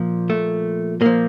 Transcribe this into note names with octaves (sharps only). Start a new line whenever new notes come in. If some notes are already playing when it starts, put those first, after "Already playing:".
Already playing: A#2 F3
A3
A#2 F3 A#3